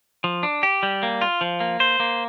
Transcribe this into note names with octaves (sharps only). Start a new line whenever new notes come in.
F3
D4
G4
G3
A#3
F4
F3
A#3
C5
A#3